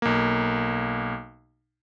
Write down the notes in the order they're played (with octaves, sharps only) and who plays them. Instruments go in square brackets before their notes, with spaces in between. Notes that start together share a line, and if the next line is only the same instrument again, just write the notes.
[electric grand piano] B1 A#3